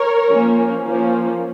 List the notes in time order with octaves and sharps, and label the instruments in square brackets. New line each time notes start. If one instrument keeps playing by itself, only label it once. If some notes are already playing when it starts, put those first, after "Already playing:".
Already playing: [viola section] A#4 C#5
F3 A#3 C#4
F3 A#3 C#4